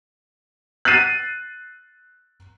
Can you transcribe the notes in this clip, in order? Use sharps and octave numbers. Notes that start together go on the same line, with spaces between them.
F#6 A6 C7 D#7